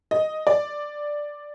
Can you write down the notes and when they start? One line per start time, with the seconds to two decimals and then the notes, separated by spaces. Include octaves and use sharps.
0.11 D#5
0.47 D5